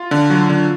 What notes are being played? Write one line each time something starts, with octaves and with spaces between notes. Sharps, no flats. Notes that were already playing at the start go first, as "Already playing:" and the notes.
Already playing: F4
D3
F#3
D3